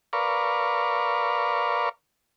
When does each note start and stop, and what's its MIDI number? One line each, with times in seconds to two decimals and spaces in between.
0.13 1.89 70
0.13 1.89 71
0.13 1.89 74
0.13 1.89 77
0.13 1.89 85